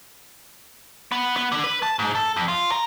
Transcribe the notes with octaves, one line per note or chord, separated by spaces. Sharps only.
B3
B3
D3
B4
A5
G#2
A4
F2
F4
A#4